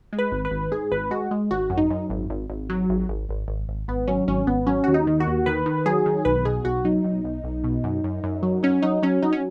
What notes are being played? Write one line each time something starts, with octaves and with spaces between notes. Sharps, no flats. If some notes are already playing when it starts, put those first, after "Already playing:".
G#3
B4
G#1
B4
G#1
G#2 G#4
G#1 B4
G#3 F#4
G#3
G#1 F#4
F#2
D#4
F#2
G#1
G#1
G#1
F#3
G#1
G#1
G#1
G#1
G#1
G#1 B3
F#3 C#4
G#1 C#4
G#1 B3
F#3 C#4
D#2 F#4
D#4
D#3
F#4
D#2
D#3 B4
D#3
F#3 G#4
D#3
B1 B4
B2 G#4
B1 F#4
F#3 D#4
B1
B1
B1
B2
F#2
F#2
F#2
F#3
F#3 C#4
F#3 D#4
F#3 C#4
F#3 D#4
C#4